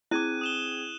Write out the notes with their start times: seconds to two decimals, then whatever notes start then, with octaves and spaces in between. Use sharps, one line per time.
0.11 C4 E4 G#4 D6 F#6 G#6 D#7
0.41 D#6 E7 G7